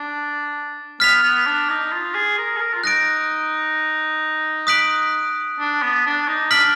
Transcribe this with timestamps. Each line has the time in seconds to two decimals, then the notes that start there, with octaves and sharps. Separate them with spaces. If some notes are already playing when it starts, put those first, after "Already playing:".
Already playing: D4
1.00 B3 F6 B6 F7
1.23 B3
1.46 D4
1.69 D#4
1.92 F4
2.14 G#4
2.38 A#4
2.56 G#4
2.61 A#4
2.74 F4
2.84 D#4 F#6 A#6 D7
4.67 D#6 F#6 B6 D7 F#7
5.59 D4
5.82 B3
6.06 D4
6.28 D#4
6.51 D4 F6 B6 D7 F#7